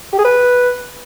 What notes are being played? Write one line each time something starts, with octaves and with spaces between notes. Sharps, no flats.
G4
G#4
B4